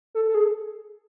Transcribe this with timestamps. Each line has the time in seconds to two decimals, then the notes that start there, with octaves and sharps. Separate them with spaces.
0.15 A4
0.28 A4
0.35 G#4